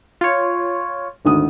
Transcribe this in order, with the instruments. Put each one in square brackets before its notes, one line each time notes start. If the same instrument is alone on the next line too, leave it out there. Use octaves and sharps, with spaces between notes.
[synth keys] F4 C#5
[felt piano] G#1 D2 D#6